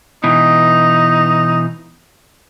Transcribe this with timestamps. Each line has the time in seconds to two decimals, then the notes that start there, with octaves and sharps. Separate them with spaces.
0.24 B2 E3 D#4